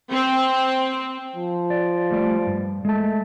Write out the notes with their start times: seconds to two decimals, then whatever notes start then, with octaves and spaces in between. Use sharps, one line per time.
0.11 C4
1.36 F3
1.70 D5
2.11 G3 A3 D5
2.46 G2
2.85 G#3 A3 A5